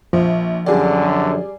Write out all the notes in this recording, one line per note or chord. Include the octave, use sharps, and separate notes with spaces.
A#1 F3
F#2 D3 G3 G#4 D5